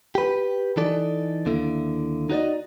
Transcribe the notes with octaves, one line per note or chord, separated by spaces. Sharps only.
G4 B4
E3 D#4 A4 D5
D#2 D3 A#3 E4
D#4 F#4 C5 D5 D#5